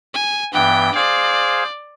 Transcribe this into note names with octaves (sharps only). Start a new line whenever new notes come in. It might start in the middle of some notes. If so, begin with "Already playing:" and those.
G#5
G2 E3 B3 G5
G#4 C5 D5 F5